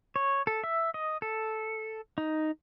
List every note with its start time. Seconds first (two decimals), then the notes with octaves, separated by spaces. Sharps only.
0.16 C#5
0.47 A4
0.64 E5
0.94 D#5
1.22 A4
2.18 D#4